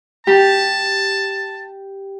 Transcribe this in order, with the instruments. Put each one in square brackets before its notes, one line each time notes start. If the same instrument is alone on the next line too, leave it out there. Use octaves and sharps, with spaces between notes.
[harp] G4 [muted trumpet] A5